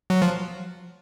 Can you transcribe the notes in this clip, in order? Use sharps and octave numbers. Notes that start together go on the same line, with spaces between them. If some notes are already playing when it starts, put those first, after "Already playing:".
F#3
F3